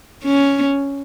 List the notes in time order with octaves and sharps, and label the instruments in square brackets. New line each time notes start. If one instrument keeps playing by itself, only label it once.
[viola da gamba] C#4